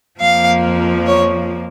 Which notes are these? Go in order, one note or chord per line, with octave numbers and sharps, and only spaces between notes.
F2 F3 A#3 F5
C#5